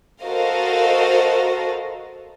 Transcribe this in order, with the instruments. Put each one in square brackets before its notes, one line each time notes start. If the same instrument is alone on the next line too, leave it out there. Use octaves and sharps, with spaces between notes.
[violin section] F#4 A4 A#4 C5 D#5 F5